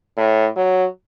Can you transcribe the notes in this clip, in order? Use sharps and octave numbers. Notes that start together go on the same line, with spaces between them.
A2
F#3